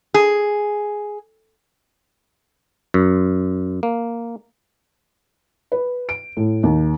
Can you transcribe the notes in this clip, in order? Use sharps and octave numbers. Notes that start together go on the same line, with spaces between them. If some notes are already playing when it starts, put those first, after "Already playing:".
G#4
F#2
A#3
B4
D7
A2
D#2